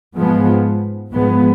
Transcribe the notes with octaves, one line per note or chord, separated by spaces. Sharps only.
G#2 F3 G#3 B3
G#2 F3 G#3 B3